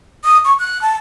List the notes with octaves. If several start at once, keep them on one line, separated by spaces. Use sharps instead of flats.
D#6
C#6
F#6
A5